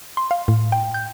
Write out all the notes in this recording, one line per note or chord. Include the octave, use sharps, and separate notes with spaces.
C6
F5
A2
G5
G6